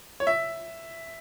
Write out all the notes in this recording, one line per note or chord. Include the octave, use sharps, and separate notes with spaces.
C#5
E5